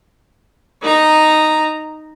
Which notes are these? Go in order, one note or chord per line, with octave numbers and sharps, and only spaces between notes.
D#4 A#5